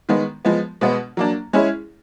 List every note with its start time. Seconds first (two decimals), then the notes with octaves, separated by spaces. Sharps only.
0.09 D#3 G#3 B3
0.45 F3 G#3 B3
0.81 B2 G#3 B3
1.17 F#3 A#3 D4
1.53 G#3 C#4 E4 G#4